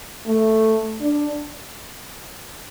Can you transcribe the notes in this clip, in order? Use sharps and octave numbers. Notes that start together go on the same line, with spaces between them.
A3
D4